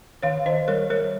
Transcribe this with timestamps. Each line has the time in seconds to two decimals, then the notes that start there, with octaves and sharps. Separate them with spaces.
0.23 D#3 C#5 F5
0.46 D#3 C5 D#5
0.68 G3 A#4 C#5
0.90 G3 A#4 C#5